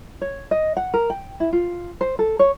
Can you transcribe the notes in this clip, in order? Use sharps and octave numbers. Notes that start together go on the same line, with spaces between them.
C#5
D#5
F#5
A#4
G5
E4
F4
C5
A4
C#5